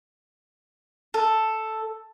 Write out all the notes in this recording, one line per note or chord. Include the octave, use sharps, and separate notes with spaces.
A4